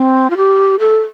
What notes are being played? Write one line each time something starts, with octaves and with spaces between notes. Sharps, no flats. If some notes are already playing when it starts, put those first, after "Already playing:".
Already playing: C4
F4
G4
A4